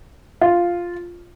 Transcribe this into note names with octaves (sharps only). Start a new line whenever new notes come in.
F4